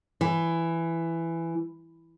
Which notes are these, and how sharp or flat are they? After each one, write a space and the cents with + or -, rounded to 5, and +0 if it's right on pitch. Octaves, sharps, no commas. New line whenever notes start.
E3 +10